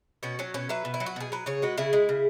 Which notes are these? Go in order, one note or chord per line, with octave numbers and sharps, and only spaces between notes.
B2 C#4 F#4
F#3 C#4
B2 C#4
F#3 B4 E5
B2
E4
F#3
F#4
B2 G#4
F#3 B4
C#3 G#4 C#5
G#3 F#4 B4
C#3 E4 G#4
G#3
C#3